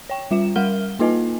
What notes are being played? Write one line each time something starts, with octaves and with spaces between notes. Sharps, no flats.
C#5 G5
G3 F4 E5 E7
G3 A#4 F5 F#5 F6 G7
A#3 D#4 F4 B4 D#5 G#5